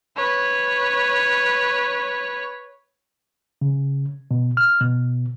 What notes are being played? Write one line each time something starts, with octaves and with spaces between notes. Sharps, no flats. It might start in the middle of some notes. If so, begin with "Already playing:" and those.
B4 C#5
C#3
B2
F6
B2